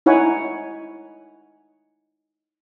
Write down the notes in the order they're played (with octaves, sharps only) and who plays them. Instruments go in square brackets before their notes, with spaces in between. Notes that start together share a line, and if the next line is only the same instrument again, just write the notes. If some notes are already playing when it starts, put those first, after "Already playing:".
[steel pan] D#4 E4 C#5 F#5 G#5 B5